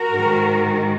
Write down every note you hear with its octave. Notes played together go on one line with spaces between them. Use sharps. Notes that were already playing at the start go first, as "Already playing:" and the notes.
Already playing: F#4 A#4
G#2 D#3